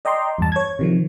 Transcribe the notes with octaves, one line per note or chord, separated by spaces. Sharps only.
D5 D#5 G5 A#5 C6
E2 G2 A5
C#5 G#6
C3 D#3 F3